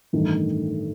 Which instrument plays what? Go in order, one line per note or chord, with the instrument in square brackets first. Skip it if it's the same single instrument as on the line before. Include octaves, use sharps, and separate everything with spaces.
[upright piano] A1 G2 D#3 A3